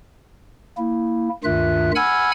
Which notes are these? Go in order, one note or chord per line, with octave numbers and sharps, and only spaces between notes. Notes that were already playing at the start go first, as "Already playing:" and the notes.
A#3 E4
D2 G2 D#3 F4 E5 F#6
F#5 G#5 B5 E6 F6 G#6